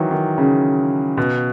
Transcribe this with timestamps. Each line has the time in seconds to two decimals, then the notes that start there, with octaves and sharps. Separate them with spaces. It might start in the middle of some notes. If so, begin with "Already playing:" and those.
Already playing: D#3 E3 F#3
0.11 D#3
0.38 C#3
1.17 B2